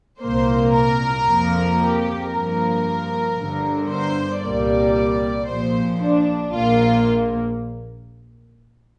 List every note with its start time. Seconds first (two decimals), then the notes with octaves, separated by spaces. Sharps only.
0.21 C2 A#2 A#3 C5
0.74 A#4
1.26 F2 F3 A#3
1.80 G4
2.32 G2 F3 A#3 A#4
3.37 G1 G2 D3
3.90 C5
4.42 C2 A#2 G3 A#3 D5
5.48 A#1 A#2 F3 C5
6.00 D4
6.53 A#1 A#2 A#3 F4